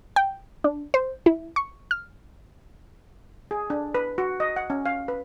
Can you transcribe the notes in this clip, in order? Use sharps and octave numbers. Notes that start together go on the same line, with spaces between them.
G5
D4
C5
E4
C#6
F6
G#4
D4
B4
F#4
D#5
F#5
C#4
F5
B4